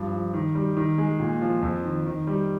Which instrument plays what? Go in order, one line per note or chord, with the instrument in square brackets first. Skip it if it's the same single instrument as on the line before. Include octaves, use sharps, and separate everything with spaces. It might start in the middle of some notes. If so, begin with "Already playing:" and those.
Already playing: [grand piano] G2 F3
F3
D#3
G3
D#3
G#3
A#2
F3
F2
D#3
D#3
G3